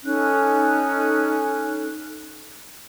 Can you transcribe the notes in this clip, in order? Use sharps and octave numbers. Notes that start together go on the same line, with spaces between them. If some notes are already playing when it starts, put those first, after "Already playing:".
C#4 D#4 A4 F#6